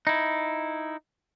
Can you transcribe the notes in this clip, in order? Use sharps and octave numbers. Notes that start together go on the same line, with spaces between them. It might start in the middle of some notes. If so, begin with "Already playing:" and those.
D#4 E4